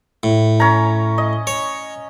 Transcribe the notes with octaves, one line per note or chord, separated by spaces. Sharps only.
A2
C#4 A#5
D#5
C#5